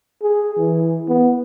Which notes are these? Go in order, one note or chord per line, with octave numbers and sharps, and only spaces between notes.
G#4
E3
B3